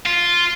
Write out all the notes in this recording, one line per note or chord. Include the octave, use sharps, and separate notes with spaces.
F4